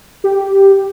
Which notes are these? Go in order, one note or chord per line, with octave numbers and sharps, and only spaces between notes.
G4